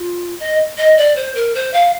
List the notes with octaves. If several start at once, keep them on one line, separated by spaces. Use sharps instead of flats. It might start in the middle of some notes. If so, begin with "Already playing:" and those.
Already playing: F4
D#5
D#5
D5
C5
A#4
C5
F5